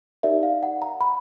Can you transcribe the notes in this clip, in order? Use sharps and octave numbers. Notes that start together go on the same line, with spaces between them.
D#4 G4 A#4 D5 E5
F5
F#5
A#5
B5